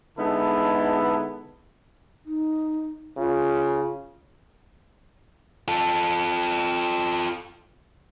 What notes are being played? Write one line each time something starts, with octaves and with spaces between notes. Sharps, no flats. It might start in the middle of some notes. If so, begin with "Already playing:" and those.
D3 G#3 B3 D#4 E4 A4
D#4
C#3 F4
F4 A4